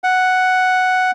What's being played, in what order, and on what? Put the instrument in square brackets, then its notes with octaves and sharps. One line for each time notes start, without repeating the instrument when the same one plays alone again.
[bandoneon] F#5